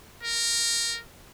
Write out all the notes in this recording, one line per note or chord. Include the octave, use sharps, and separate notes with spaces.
A#4